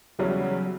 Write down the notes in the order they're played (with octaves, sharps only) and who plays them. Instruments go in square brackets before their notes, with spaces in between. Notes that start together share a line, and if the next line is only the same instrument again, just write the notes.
[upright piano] E2 C#3 G3 C#4 E4 [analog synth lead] F#3